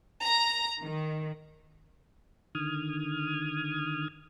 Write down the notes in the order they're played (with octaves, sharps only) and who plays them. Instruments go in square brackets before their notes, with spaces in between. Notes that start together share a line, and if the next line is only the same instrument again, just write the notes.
[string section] A#5
D#3
[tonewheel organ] D3 D#3 D#6 F6 G#6